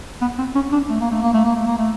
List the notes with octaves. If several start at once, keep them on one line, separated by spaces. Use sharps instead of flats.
B3
C4
C#4
D4
A3
A#3
A3
A#3
A3
A#3
A3
A#3
A3